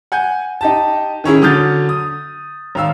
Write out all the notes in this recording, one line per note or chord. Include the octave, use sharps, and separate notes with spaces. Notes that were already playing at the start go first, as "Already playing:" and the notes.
F#5 G#5 G6
D#4 G4 A5
D#3 C#4 E4 G#4
D3 F#3 D#6 F6 G6 A6
D#6
G#1 F5 E6